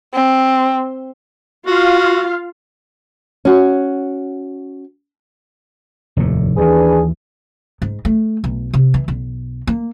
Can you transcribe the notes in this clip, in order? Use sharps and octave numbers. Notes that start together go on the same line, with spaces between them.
C4
F4 F#4 F5
C#4 F#4
F1 D#2 A2
D#2 E3 D4 G#4 B4
G#2
A3
B1
C3
E3
B1
A#3